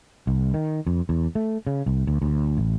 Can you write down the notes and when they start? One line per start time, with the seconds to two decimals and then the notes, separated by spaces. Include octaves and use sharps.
0.27 C2
0.54 D#3
0.87 F2
1.09 E2
1.35 A3
1.67 C#3
1.86 C2
2.07 D2
2.22 D2
2.57 A1